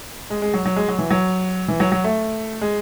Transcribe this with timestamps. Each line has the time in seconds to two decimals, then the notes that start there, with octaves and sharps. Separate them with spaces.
0.30 G#3
0.42 G#3
0.54 F#3
0.66 F#3
0.76 G#3
0.88 F#3
0.99 E3
1.10 F#3
1.68 E3
1.80 F#3
1.92 F#3
2.04 A3
2.61 G#3